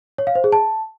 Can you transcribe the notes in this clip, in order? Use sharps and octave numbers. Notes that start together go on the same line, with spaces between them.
C#5
F5
C5
G#4
A5